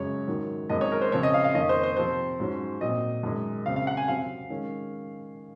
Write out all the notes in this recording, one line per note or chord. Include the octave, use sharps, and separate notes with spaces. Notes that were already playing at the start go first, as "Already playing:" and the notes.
Already playing: F#2 C#3 G#3 C#4 C#5
G#2 D#3 F#3
F#2 D#3 G#3 C4 D#5
C#5
A#4
C5
C#3 F3 C4 C#5
D#5
F5
F5
F2 D#3 A#3 C#4 D#5
C5
C5
C3 F3 C4 C5
G#2 F#3 C#4
A#2 F#3 C4 D#5
F#2 D#3 G#3
C#3 F#3 C4 F5
F5
F#5
G#5
C3 F#3 C4 F5
D#3 G#3 C#4